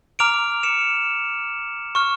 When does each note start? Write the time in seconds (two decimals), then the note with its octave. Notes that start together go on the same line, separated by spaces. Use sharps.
0.19 A#5 D6 F6 D7 F7
0.63 C#7 E7
1.95 C#6 F6